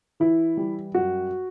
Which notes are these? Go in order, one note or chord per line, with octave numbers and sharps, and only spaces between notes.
E3 E4
G3
F#2 F#4